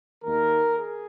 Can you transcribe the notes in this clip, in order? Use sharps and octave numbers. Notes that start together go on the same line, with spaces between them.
D#2 D#3 A#3 A#4
G#4